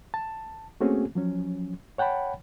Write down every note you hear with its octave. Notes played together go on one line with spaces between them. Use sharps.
A5
A3 A#3 C4 C#4 F#4 G#4
F3 F#3 C#4
C#5 F#5 G5 A5 B5